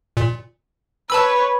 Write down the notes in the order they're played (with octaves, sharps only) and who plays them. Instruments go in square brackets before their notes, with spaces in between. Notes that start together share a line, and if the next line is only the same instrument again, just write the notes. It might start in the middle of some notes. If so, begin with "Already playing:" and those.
[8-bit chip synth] A#2
[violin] B4 C#5 [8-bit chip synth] A5 B5 E6